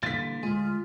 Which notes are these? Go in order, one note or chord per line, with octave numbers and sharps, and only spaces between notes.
A#2 D3 E3 G3 F4 A6 B6
D2 G#3 F4 G#4